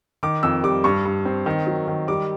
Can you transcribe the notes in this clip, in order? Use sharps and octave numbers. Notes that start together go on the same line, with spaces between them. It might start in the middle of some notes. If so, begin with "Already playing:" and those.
D#3 D6
F2 E6
G3 D6
G2 C#6
G2
C4
D#3
F#3
D#3
G3 D6